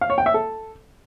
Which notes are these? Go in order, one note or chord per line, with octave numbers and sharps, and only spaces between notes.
F5
C#5
G5
E5
A4